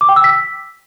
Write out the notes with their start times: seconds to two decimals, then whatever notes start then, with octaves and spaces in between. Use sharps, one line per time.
0.01 D6
0.09 G5
0.16 E6
0.24 B6